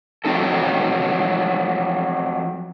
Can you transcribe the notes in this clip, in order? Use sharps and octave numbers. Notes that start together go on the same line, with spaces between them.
F3 F#3 C4 D#4 A4